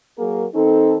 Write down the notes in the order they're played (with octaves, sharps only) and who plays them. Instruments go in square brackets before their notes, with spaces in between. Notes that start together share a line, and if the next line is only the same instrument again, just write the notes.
[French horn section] F#3 A#3 G#4 A#4
D#3 C4 D#4 A4